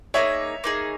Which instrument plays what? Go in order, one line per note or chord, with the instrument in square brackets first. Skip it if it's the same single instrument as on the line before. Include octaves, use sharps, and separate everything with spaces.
[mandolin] A#3 D#4 G#4 [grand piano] C#5 E5
[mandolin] A#3 D#4 G#4